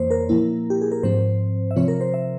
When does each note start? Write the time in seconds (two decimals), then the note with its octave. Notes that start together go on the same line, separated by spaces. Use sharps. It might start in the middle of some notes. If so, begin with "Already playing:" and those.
Already playing: F2 E3 A#3 C5 C#5
0.11 A#4
0.29 A#2 F3 A#3 E4
0.70 G4
0.82 G#4
0.92 A#4
1.03 G#2 F3 C4 C5
1.71 E5
1.76 C3 F3 C4 F4 C#5
1.88 A#4
2.01 C5
2.14 E5